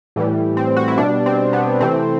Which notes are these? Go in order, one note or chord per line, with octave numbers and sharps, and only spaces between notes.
A2 E3 G3
C4
F#4
E4
B2 G3 D4
C4
B3
C3 E3 A3 C4